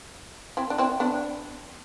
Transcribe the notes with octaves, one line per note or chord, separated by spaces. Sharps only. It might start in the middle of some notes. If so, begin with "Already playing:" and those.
C4 E4
D4
C4 E4
B3 D4